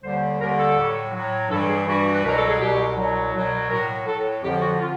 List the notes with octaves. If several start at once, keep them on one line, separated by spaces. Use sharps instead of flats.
D#2 D3 G3 C5
D#2 D3 G3 A#4
A4
A2 F#3
A2 F#3
G2 E3 G3 A4
G#4
G2 E3 G3 F#4
B4
C2 B2 F#3 A#4
A4
G#4
C2 B2 F#3 G4
C2 B2 F#3
C2 B2 F#3
A2 F#3 A#4
A2 F#3 A4
F2 D3 F3 G4
F#4
D3 F4